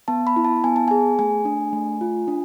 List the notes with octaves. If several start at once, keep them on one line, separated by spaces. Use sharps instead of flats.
B3 A5
B5
E4
A5
B3 G#5
A5
G#4 G#5
A3 G#5
D4
A3
F4
D4